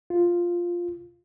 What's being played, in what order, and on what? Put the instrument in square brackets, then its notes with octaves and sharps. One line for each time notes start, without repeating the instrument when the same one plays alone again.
[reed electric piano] F4